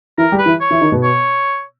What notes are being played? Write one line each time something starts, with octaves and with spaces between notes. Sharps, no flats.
E3 E4 A#4
G3 G4
B4
E3 E4
C#5
E3 E4
D#3 D#4
B2 B3
C#5